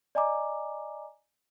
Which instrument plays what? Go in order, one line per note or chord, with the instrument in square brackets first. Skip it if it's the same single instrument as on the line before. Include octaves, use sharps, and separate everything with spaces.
[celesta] D5 D#5 G#5 A#5 D6